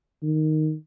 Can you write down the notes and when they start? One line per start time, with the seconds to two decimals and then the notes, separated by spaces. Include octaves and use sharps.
0.23 D#3